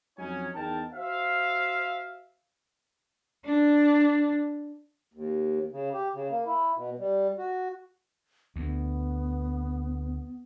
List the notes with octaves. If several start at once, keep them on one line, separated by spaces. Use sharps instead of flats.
F2 F#3 C#4 D#4 C#5 G#5
E2 D#4 A#4 G5 A5
F#4 C5 E5 F5
D4
D#2
C#3
G4
C#3
A#3
E4
B2
G3
F#4
D2 B3